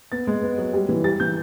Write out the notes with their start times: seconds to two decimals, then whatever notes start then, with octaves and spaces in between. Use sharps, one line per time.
0.12 B3 A6
0.27 G#3
0.43 B3
0.58 F#3
0.74 G3
0.89 E3
1.04 G3 A6
1.20 E3 G6